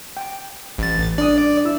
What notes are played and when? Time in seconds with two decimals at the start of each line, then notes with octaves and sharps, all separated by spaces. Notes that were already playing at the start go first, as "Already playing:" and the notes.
0.17 G5
0.78 A1 A6
1.18 D4 D5 D#6
1.65 E4 E6